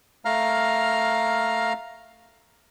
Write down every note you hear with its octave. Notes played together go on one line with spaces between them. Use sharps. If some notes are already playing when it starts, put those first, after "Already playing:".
A3 F5 A#5 F6